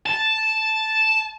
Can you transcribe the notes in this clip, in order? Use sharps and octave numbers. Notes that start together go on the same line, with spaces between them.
A5